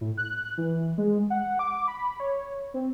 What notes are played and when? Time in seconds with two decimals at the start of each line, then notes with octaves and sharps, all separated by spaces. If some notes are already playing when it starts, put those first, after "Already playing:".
0.01 A2
0.17 F#6
0.58 E3
0.98 G#3
1.30 F#5
1.59 D6
1.88 B5
2.20 C#5
2.74 C4